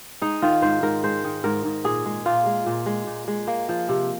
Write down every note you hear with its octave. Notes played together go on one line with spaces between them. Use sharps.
G#3 D#4
D#3 F4
G#2 C5
G#2 A#4
G#3 C5
D#3
G#2 A#4
G#2
A#2 G#4
G#3
A#2 F4
G#3
A#2
G#3
A#2
G#3
A#3
F3
C3